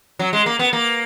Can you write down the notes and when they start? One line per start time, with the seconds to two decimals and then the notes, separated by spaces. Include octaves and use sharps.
0.19 F#3
0.33 G#3
0.46 A#3
0.59 B3
0.73 A#3